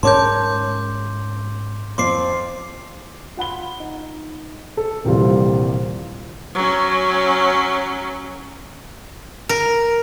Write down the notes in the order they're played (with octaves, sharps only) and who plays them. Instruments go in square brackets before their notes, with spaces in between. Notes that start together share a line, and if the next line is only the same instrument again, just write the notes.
[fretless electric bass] G#2 C#4 [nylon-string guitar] A#4 C#5 A5 [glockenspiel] C6 D6 G6
[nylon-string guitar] F2 C4 [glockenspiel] C6 D6 C7
[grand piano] F4 F#5 B5 G7
D#4
A4
D#1 A#1 C3 E3 G3 F4
[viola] F#3 C#4
[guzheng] A#4